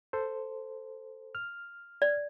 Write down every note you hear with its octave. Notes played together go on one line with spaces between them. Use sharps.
A4 C5
F6
D5